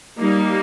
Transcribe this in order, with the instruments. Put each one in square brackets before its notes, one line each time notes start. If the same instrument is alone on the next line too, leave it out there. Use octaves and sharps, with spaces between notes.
[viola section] G3 A#3 D#4